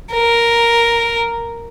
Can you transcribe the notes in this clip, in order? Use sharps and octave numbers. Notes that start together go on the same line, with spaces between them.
A#4